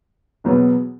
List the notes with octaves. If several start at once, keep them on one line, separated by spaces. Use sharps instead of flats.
E2 B2 F#3 B3